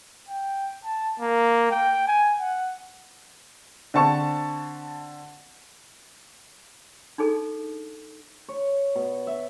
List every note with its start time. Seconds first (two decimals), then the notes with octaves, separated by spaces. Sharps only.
0.29 G5
0.85 A5
1.20 A#3
1.71 G5
2.08 G#5
2.40 F#5
3.94 D3 C4 A5 C#6
7.18 D4 D#4 G#4 A4
8.49 C#5
8.95 B2
9.27 E5